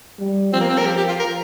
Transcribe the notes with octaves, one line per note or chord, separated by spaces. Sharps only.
G3
F3 C4
A#3
C4
A#4
G4
G4
F4
A#4